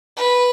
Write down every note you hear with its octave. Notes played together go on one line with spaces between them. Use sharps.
B4